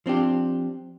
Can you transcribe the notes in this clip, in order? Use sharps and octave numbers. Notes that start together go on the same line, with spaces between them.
F3 C4 D4 G4